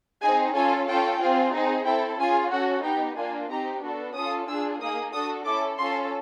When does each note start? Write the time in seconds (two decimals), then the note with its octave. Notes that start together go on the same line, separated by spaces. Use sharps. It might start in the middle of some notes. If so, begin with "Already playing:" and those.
0.22 C4 D#4 G#4 G#5
0.56 C#4 F4 A4 G#5
0.88 C#4 F4 A4 G5
1.21 C4 F4 G#4
1.54 C4 D#4 G#4
1.86 C4 E4 A4 G5
2.19 C#4 F4 G#4 G#5
2.52 C#4 F#4 A4 F#5
2.84 B3 D#4 G4 G5
3.17 A#3 D4 F4 G#5
3.50 C4 D#4 G4 A#5
3.83 B3 D4 F#4 A4
4.15 C#4 F4 A4 D#6
4.48 D4 F4 G#4 E6
4.81 A#3 D#4 G#4 D#6
5.14 D4 F#4 A4 D#6
5.46 C#4 E4 A4 D6
5.79 C#4 F4 A4 C6